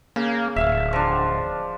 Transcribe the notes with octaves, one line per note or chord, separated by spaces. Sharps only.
C#3 A#3
D1 E5 F5
F3 D4